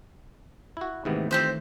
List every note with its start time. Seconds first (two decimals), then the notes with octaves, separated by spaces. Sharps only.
0.77 E4 F#4
1.05 G#2 C3 D#3 E3 A3 B3
1.31 F2 C4 G4 C5